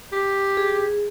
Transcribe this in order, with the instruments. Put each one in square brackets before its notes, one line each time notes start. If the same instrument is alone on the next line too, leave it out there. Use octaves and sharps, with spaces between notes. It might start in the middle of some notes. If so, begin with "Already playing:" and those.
[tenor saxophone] G4
[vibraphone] G#4